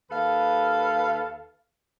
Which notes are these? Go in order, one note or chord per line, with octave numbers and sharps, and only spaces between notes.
D#2 A4 B4 F5